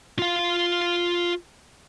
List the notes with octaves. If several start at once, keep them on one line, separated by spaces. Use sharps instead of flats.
F4 F5